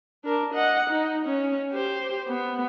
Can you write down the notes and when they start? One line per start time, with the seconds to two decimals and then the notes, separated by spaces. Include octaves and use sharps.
0.24 D4 A#4
0.54 D#5 F#5
0.90 D#4
1.25 C#4
1.72 G4 C5
2.28 B3